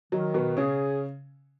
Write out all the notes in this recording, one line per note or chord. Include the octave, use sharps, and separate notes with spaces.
D#3 F#3
B2 B3
C#3 C#4 G#4